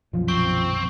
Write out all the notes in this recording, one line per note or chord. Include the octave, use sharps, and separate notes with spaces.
D#1 B1 F#2 F3
C4 C#6